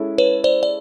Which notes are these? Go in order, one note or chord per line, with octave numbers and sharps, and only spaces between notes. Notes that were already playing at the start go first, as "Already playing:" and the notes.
Already playing: G#3 C#4 E4 A4
B4 C#5
C5 D5
D5